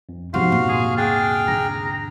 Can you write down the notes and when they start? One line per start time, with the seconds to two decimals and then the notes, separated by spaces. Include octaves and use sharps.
0.09 F2
0.34 E2 G#2 C3 F3 F#4 F5 C6
0.52 A#2
0.68 G#4
0.98 D4 G#4 G5 F6
1.48 D3 A#5